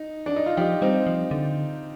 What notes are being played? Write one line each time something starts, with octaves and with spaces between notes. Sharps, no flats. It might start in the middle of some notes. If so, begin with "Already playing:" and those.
Already playing: D#4
D4
D#4
F4
F3 D#4 G4
G3 C4 D#4
F3
D3